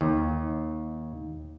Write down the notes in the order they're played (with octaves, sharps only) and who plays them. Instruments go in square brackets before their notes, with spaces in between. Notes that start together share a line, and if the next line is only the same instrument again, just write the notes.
[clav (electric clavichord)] D#2